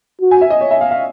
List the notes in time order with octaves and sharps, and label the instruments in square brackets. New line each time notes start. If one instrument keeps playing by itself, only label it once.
[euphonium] F#4
[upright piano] G#5
E5
D#5
C#5
E5
F5
F5